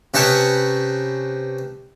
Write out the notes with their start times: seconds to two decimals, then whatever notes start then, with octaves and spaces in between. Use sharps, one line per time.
0.14 C3 C#4 D#4 B4 A5 C#6